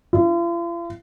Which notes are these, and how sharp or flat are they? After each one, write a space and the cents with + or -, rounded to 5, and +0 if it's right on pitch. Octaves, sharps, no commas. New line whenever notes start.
F4 -45